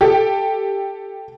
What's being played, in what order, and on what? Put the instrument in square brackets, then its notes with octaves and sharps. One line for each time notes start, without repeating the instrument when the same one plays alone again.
[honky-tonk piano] G4 A4